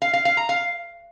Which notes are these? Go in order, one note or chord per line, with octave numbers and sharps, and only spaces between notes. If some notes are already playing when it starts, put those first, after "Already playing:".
F5
F5
F5
A#5
F5